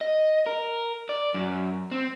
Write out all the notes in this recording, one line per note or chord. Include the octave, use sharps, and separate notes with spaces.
D#5
A#4
D5
F#2
C4